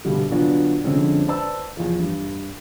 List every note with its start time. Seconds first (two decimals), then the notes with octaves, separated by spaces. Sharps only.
0.05 G2 B2 D3 G3
0.31 A#2 D3 F#3 B3 D4
0.84 F2 D3 G#3 C4 C#4
1.27 B4 C5 D5 A5 E6
1.77 E2 F3
2.00 G2